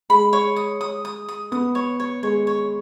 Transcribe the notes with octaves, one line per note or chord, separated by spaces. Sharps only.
G#3 B5
C#5
D#6
D#6
D#6
D#6
B3 D#6
C#5
C#5
G#3 C#5
C#5